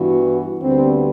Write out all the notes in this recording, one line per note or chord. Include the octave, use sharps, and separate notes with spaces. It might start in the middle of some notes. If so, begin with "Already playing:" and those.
Already playing: G2 E3 B3 F#4
D2 D3 G3 B3 C4